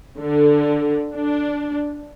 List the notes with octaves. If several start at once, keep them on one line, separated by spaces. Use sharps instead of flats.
D3
D4